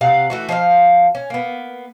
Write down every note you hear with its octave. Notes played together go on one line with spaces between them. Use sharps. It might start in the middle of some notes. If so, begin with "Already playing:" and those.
C3 F5 F#5
E3 A3 F#4
F3 C4 E5 F5
C#4
A#3 B3